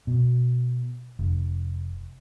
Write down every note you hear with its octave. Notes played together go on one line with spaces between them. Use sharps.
B2
F1